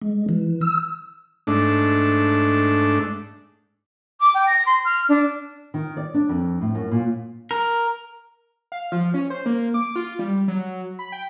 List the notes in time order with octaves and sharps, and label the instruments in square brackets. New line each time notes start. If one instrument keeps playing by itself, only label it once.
[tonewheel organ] G#3
E3
E6
[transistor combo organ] G#2 A3 D4
[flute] D6
G5
A#6
C6
F6
D4
[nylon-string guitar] D#3
D5
D4
F2
A2
F#2
A#2
[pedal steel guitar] A#4
[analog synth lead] F5
F3
C#4
C5
A#3
D6
F4
G3
F#3
B5
G5